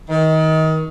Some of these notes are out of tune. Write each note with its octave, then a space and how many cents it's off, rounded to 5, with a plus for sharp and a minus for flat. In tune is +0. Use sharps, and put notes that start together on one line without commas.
D#3 +25